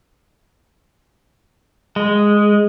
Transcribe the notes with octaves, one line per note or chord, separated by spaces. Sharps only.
G#3